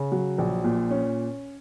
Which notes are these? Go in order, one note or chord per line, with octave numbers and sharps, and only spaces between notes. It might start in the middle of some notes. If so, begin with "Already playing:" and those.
Already playing: C#3
F#3
A#1
A#2
C#4